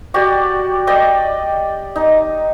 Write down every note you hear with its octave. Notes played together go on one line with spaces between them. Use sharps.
F#4 G4 D5
D5 D#5 G5
D#4